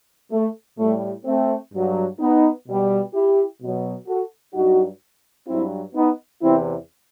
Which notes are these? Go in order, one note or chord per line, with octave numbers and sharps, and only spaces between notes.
A3
A2 G3 A3
A3 C4
G2 F#3
B3 D#4
B2 G3
E4 G4
B2 F#3
F#4 A4
G2 F#3 D#4 F#4
G2 F#3 C4 E4
B3 D#4
E2 C3 E3 C4 E4